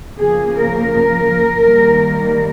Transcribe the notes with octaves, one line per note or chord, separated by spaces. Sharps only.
C#3 F3 A#3 G#4
A#4
A#4
D#3 G3 A#3